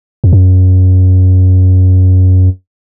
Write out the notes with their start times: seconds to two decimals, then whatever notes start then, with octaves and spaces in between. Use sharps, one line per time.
0.24 F2
0.33 F#2